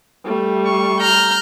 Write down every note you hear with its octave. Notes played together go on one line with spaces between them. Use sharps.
G3 A3
C#6
A#5 F6 G6